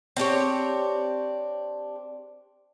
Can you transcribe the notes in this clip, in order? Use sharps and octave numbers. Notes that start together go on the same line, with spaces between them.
C4 D4 G4 C#5